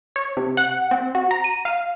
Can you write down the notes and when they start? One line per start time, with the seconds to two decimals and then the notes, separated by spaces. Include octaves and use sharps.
0.16 C#5
0.37 C3
0.57 F#5
0.91 C4
1.15 F#4
1.31 A#5
1.44 D#7
1.65 F5